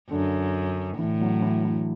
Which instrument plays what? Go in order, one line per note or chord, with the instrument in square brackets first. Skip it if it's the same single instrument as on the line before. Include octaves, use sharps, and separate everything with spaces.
[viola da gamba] F#2 [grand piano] D3
[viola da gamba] A2 [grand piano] E3
[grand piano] F#3
E3
E3